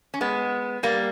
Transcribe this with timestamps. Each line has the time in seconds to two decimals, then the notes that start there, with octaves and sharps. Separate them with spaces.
0.14 C#4
0.21 G#3 B3
0.83 G3 A#3